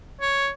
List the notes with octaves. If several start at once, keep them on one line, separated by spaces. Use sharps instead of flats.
C#5